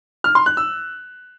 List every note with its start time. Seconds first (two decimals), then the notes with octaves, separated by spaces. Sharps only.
0.24 F6
0.35 C6
0.46 F#6
0.57 E6